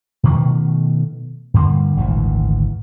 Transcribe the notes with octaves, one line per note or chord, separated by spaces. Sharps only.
B2 D#3 F3 A3
G2 D3 G3 A#3
G#1 D2 A#2 E3